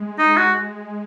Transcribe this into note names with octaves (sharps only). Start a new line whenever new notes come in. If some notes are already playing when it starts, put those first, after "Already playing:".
Already playing: G#3
D#4
F#4